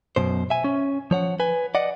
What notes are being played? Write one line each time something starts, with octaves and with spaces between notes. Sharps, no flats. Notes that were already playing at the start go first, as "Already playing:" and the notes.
F#2 B2 C5
E5 G#5
C#4
F3 C#5 F#5
B4 G#5
D5 D#5 F#5